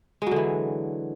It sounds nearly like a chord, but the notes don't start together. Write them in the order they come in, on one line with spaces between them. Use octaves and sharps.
G#3 F#3 D3 E3